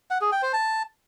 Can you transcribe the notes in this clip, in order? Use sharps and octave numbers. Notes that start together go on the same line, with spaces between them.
F#5
G#4
G5
C5
A5